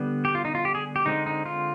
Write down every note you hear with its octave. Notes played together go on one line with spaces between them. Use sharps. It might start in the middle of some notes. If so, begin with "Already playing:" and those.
Already playing: D3 G3 B3
G4
F4
D#4
F4
G4
G#4
G4
D3 G#3 C4 D#4
D#4
F4